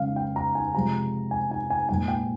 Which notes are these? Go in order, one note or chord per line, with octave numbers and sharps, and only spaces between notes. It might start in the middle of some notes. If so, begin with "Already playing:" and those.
Already playing: C#3 G#3 F5
G5
A#5
G#5
C3 F3 G#3 A#5
G#5
G#5
G#5
A#2 G#3 G#5
G5